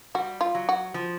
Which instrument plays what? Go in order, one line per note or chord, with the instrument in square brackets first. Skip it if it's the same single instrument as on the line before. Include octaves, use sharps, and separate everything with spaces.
[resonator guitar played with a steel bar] G3 [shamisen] F#4
[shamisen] F4
[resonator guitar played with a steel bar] F#3
[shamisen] F#4
[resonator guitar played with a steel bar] F3